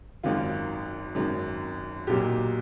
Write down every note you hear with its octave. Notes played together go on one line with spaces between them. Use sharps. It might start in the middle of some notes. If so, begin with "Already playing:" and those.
G#1 F#2 D#3 F4
G#1 F#2 D#3
B1 A#2 F#3 G4